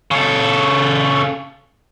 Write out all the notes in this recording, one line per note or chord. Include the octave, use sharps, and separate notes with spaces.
C#3 A4